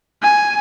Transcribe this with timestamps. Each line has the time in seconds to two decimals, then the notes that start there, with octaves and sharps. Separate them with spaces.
0.23 G#5